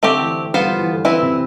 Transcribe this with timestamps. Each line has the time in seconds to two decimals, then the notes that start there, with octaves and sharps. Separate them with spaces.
0.03 D3 A3 C4 G4
0.20 E3
0.54 G3 B3 F4 C5
0.66 F3
0.79 E3
0.92 D3
1.04 E3 C4 E4 B4
1.22 C3